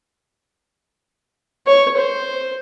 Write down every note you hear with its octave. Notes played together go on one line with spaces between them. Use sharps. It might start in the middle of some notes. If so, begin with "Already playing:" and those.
C#5
C5